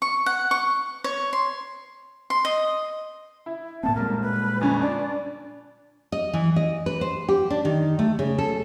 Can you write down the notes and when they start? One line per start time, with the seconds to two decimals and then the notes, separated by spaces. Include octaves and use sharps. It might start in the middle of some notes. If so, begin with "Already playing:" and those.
0.02 C#6
0.26 F#5
0.51 C#6
1.04 C#5
1.33 C6
2.30 C6
2.45 D#5
3.46 E4
3.83 A2 A#3 C4 A5
3.95 A#2 G3 G#3 A#4
4.22 B4
4.61 F2 D3 C#4 G#5
4.82 D4 D5
6.12 D#5
6.33 E3
6.56 D#5
6.86 B4
7.01 C5
7.29 G4
7.50 D4
7.65 D#3
7.99 A3
8.19 C#3
8.39 A4